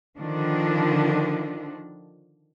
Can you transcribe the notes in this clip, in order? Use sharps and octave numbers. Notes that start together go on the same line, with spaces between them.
D3 D#3 F3 D4